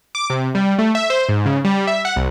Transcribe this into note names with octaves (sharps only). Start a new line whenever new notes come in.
D6
C3
G3
A3
E5
C5
G#2
C#3
G3
E5
F#5
C2